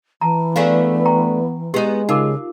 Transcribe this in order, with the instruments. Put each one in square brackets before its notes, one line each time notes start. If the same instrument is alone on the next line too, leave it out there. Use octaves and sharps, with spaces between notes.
[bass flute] E3 [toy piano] A5 A#5
[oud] A3 D4 G#4 [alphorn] B3 [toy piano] F5
[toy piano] G5 A#5 C#6
[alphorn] G#3 [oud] B3 D#4 [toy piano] G4
[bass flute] C#3 [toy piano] D#4 A#4 D6 [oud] F4